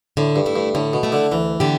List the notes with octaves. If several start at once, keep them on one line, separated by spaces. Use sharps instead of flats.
A2 D3
G2
A3 E4
G2
A2 D3
B2
A3 E4
D3
D2 E3
D3 B3 G4